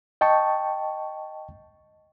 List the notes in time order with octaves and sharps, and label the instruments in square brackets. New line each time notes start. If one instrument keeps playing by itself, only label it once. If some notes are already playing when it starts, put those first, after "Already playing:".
[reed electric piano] D#5 G5 A5 C#6